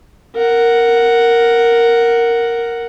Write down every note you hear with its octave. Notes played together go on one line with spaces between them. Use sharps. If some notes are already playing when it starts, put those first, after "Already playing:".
A#4 F#5